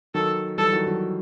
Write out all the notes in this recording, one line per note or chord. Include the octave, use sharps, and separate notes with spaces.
D#3 F#3 A4
E3 G3 A4
D#3 F#3
D#3 F#3